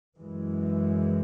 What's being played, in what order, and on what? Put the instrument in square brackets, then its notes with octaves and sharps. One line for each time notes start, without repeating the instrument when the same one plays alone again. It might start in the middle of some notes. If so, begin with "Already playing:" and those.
[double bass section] F#2 E3 G#3